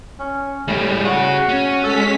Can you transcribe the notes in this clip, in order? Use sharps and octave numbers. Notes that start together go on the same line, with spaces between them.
C#4
A2 G3 G#3
F#4 G#4 C#5
C#4
G#3 A4 B6